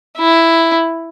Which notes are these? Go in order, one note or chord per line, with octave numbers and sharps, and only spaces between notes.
E4